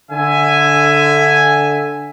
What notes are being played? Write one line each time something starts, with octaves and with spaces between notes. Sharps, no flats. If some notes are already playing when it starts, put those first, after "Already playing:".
D3 E5 G#5